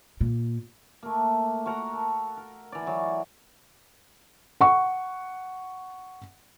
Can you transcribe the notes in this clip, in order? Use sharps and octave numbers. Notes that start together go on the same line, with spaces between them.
A#2
A3 A#3
F#4 A#4 F#5 A#5
A4
A#4
E3 D5
E3 F#3
F#5 C#6